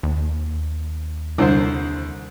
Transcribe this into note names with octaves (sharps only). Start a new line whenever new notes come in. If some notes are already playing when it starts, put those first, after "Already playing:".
D#2
C2 D3 C5